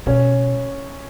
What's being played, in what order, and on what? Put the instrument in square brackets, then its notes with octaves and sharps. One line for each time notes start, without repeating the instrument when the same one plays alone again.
[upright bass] B2 [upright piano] C#4